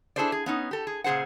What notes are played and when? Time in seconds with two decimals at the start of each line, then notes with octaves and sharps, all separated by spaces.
0.16 D4 E4 G#4 A4 C5 D5
0.32 G#4
0.46 B3 C#4 D#4
0.71 G4 A4
0.87 G#4
1.04 A#2 C#3 G#4 C5 F#5